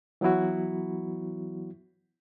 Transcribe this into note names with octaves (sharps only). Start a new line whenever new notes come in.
E3 F#3 B3 E4 F#4